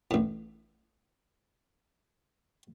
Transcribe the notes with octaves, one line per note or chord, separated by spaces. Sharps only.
A1 A2